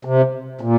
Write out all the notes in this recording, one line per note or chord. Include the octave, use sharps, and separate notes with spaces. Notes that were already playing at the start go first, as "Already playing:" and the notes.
C3
A#2